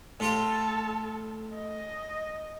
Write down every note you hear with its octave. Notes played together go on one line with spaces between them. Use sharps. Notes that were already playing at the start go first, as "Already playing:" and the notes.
A2 F4 G4 A4
D#5